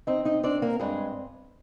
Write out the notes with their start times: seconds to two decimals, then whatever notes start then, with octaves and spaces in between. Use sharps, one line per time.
0.07 C4 D#4 D#5
0.25 D#4 D#5
0.43 C4 D4 D5
0.62 A#3 A#4
0.80 G2 G#3 G#4